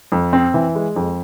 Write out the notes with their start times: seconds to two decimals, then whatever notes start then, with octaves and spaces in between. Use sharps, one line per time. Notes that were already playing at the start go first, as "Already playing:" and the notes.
0.12 F2
0.33 C4
0.54 E3
0.75 G#3
0.96 F2